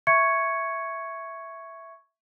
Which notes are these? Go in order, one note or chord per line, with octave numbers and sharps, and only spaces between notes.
E5 C#6 G#6 C#7